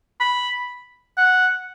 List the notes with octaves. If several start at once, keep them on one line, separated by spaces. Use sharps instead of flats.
B5
F#5